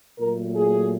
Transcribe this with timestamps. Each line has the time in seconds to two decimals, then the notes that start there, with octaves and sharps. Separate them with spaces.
0.19 A#2 F#3 A3 A#4
0.56 G#4